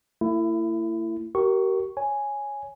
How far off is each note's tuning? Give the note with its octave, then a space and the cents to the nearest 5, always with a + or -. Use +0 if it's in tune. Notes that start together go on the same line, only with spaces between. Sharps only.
A3 +45 E4 +20
G4 -35 A#4 +0 C#6 +0
C#5 +0 G#5 +0